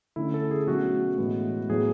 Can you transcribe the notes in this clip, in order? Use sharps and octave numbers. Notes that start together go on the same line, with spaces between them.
D3 A3 C#4 E4
A4
G#4
B2 F#3 A3 C#4 F#4
A2 E3 G#3 B3
A2 F#3 B3 G#4